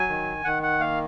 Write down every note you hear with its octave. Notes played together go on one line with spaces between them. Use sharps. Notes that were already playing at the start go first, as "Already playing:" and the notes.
Already playing: F#3 G#5
D#3
D#3 F#5
F#5
A#3 F5